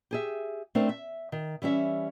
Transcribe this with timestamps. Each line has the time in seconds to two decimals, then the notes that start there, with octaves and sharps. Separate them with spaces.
0.11 G4 G#4 E5
0.75 A3 C4 D4 A#4 C5
0.89 E5
1.32 D#3
1.62 E3 G3 C#4 E5